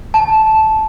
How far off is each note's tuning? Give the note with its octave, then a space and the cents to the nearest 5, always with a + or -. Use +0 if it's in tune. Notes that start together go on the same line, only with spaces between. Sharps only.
A5 -10